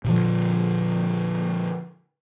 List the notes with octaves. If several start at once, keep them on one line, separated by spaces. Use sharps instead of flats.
A#2 D3 F3